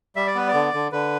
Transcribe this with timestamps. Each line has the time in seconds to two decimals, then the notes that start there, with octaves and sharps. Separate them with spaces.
0.16 G3 E5
0.27 D5
0.35 B3 B4
0.48 D5
0.54 D3
0.74 D3
0.92 D3 B4